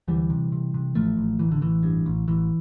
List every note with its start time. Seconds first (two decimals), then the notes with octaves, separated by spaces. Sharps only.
0.08 D2 E3 G3
0.30 C3
0.52 C3
0.74 C3
0.95 A1 F3 A3
1.17 A1
1.39 A1 E3
1.52 D3
1.61 A1 E3
1.83 G2
2.06 A1
2.28 A1 E3